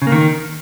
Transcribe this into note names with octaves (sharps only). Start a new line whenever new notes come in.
C#3
A#3
D#3